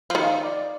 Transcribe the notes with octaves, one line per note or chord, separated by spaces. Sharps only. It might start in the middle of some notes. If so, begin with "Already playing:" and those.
F3
D#3 F5
D#5
D5